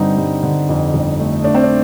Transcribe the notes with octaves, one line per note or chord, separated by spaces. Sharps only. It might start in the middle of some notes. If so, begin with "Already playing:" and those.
Already playing: G2 D3 G3 C4 D#4
G2
D3
F2
G1
A3
A3 D4
C4
D4